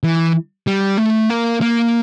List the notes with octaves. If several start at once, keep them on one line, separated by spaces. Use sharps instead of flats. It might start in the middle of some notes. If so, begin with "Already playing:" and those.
E3
G3
A3
A#3
A#3